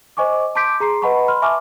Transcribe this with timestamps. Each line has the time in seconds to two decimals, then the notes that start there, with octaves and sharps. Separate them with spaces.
0.17 C5 D#5 G#5 C#6 D6
0.55 A5 C6 D6 G6 B6 D7
0.80 G#4 A#5 C6 C7
1.02 B4 D#5 F#5 A5 B5 C#6
1.28 B5 C6 F6
1.42 E5 G#5 A5 C#6 D6 F6